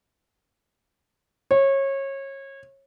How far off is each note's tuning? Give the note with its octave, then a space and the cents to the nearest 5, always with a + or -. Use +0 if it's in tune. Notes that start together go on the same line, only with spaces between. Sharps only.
C#5 -25